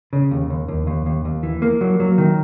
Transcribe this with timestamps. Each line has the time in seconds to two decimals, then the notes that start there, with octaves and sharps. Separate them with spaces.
0.13 C#3
0.31 D#2
0.50 D#2
0.68 D#2
0.87 D#2
1.06 D#2
1.25 D#2
1.43 E3
1.62 A#3
1.81 F#3
2.00 F#3
2.18 D#3